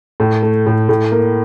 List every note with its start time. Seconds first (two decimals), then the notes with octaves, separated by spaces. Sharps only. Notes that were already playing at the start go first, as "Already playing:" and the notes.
0.20 A2
0.42 A3
0.66 A2
0.89 A2
1.12 A#3